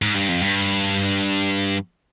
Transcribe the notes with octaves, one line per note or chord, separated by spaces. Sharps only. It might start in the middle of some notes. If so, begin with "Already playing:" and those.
G#2
G2
F2
G2